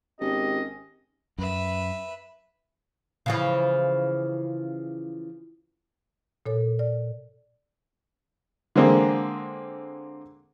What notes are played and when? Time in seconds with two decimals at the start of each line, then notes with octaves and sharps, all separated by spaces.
0.21 G#1 C#4 G4 D#5
1.38 F#2 B4 E5
3.26 C#3 E3 F3
6.46 A#2 A4 C#5
6.79 D5
8.76 D3 G#3 A#3 C4